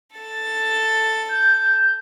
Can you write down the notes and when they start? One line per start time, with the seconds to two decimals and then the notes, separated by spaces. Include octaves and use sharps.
0.16 A4 A6
1.29 G6